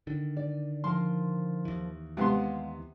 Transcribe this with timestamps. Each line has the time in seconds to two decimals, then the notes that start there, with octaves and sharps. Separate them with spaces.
0.07 D3 D#3
0.37 D5
0.84 F3 A#4 C6
1.65 D#2 E3
2.17 C3 G#3 B3 F5 F#5 C6